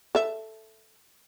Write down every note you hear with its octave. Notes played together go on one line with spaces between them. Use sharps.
A4 E5